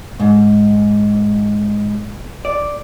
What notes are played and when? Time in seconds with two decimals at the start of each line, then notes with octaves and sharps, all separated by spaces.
0.20 G#2
2.45 D5